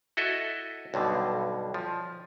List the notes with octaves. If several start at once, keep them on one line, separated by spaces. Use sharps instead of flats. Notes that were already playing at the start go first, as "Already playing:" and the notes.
E4 F#4 A4 D#5 E5
B1 G2 B2 D3
F3